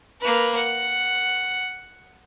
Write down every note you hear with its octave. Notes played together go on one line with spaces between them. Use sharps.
A#3 B4
F#5